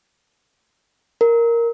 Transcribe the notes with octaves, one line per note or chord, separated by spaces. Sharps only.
A#4